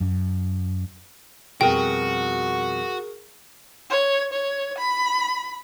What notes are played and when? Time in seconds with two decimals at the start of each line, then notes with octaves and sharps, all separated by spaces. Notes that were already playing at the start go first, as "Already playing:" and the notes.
0.01 F#2
1.61 F2 B2 G3 F#4 G#4 A#4 G5
3.90 C#5
4.33 C#5
4.78 B5